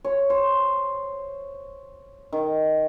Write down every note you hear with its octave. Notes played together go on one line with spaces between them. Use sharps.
C#5
C5
D#3